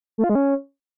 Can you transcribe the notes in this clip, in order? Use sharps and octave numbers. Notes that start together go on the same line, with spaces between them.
A3
F4
G#3
C#4